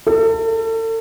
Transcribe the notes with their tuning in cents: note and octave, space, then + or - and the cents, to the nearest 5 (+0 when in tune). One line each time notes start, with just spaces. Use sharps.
A4 +40